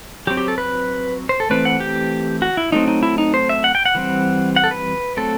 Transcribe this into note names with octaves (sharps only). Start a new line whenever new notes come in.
F#3 C4 G4
G4
A4
B4
C5
A4
E3 A3 C4 B4
F#5
G4
F#4
E4
F#3 A3 C4 D#4
D#4
E4
D#4
C5
E5
F#5
G5
F#5
E3 G3 C4
F#5
A4
B4
F#3 A3 C4 A4